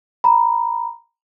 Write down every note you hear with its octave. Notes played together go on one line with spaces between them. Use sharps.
A#5 B5